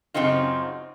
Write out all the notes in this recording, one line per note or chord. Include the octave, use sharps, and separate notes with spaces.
F#2 C#3 C4 D#4 F4